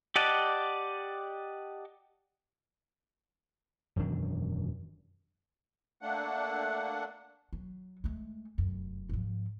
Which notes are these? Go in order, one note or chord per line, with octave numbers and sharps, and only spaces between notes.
G4 D5 D#5 F#5 A5
E1 F#2 D#3 D4
A3 A#3 D4 F#5
F#3
G#3 A3
F1 F#2
G#2 F3